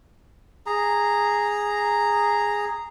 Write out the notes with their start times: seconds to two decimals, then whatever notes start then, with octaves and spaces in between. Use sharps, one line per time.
0.66 G#4 A#5